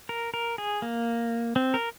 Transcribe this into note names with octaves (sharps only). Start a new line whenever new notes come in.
A#4
A#4
G#4
A#3
C4
A#4